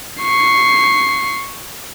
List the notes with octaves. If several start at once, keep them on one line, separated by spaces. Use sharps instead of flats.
C#6 C7